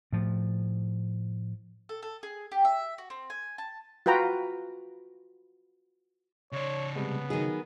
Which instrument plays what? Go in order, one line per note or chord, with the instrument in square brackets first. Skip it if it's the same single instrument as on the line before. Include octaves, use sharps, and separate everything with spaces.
[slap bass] A2 F3
[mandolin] A4
A4
G#4
G4
E5
F#4
C4
G#5
A5
[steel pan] F4 F#4 B4 G5 A#5
[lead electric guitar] C#3 D5 [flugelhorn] C#5
[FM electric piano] C3 G3 G#3 [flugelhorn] B3
[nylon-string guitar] D#3 G#4 [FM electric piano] F#3 D#4